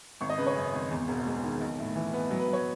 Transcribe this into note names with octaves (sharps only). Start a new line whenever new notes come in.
G#1 C#6
D#5
C#3 B4
C#5
F#2
G#1
E2
E1
G#3
D#3
B1
A2
E3
B3
F#3
B4
F#3 C#5